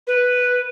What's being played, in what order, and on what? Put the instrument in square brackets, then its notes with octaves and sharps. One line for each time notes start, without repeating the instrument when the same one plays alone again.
[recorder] B4